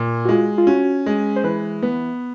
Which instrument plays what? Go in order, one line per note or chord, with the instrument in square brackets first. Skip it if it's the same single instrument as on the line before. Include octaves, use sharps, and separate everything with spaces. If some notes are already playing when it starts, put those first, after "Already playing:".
Already playing: [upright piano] A#2
[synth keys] F#4
[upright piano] G#3 [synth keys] F4
[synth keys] F4
[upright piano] C#4 [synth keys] F#4
[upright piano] G#3
[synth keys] C5
[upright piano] E3 [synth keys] B4
[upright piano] B3 [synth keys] B4